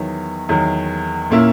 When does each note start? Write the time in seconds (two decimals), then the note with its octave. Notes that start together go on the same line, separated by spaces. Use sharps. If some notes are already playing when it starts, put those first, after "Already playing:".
Already playing: E2 D#3 F#3
0.49 E2 D#3 F#3
1.30 A#2 A#3 C#4 E4